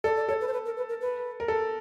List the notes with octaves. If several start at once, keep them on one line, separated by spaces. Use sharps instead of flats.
A4 D5
D5
A4 C#5
B4
C5
B4
A#4
B4
A#4
B4
A#4
A4